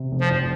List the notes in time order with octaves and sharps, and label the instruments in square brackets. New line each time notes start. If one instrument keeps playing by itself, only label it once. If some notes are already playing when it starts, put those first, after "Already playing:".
Already playing: [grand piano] C3
F1
[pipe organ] F3
[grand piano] F2